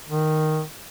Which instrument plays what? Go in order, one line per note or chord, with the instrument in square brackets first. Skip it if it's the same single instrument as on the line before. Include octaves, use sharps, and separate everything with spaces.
[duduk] D#3